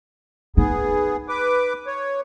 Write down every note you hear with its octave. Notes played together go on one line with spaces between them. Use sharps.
B3 D#4 G#4
B4 D6
C#5